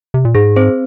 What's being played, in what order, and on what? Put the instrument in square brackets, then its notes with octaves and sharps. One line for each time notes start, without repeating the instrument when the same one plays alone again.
[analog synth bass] C3
A#2
[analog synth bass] G#2 [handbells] G#4
[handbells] C4 C5